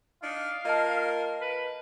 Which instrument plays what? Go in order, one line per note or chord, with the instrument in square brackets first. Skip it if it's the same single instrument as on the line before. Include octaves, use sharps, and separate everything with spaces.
[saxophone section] D4 D#4 [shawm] F5
[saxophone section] A#3 F4 A#4 [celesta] D#5 A5
[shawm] B4